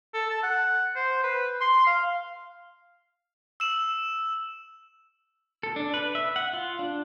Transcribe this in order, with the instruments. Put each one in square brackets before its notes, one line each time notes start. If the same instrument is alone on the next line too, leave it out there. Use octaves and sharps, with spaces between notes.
[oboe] A4
A5
F#5
C5
B4
C6
F5
[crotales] E6 E7 F#7
[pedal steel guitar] A4
D4
B4
E5
F#5
F4
D4